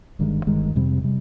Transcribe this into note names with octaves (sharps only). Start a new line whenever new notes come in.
G1 G2 D#3 G#3
G1 G2 D#3 G#3
F2 C3 G3 C4
C3 G3